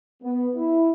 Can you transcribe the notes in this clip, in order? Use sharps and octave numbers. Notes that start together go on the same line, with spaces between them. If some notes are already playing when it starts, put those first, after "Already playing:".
B3
E4